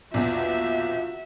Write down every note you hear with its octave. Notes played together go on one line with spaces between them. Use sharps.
A#1 E2 B2 F4 F#4 E5